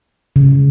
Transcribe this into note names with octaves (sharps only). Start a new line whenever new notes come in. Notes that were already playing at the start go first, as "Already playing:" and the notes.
C#3